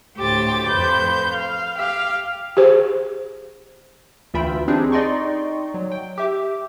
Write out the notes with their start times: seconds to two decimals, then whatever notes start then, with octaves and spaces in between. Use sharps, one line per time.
0.16 D2 A2 G4 C5 D6 A6
0.68 F2 B4 C5 G6
1.32 F5
1.76 G4 F5
2.57 G4 G#4 C5
4.34 D2 E3 F4 E5 G5 B5
4.68 C4 D4 D#4 G4 G#4
4.92 D#4 D5 D#5 G5 C6 C#6
5.74 F#3
5.92 G5
6.18 G4 E5 D6